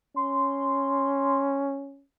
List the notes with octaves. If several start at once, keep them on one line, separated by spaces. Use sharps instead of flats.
C#4 C6